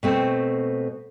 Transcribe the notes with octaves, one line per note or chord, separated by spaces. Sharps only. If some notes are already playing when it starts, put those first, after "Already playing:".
B2 A3 C4